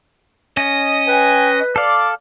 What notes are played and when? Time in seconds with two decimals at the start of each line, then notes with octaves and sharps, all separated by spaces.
0.57 C#4 D#5
1.07 B4 G5 G#5
1.76 A4 D5 F5